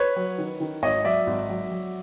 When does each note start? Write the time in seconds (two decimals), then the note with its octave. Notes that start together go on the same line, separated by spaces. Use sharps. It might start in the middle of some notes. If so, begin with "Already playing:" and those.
Already playing: B4 C#5
0.16 F#3
0.38 D#3
0.60 D#3
0.83 G#1 C#5 D#5
1.04 F#3 D5 E5
1.27 G#1
1.49 F#3
1.71 F#3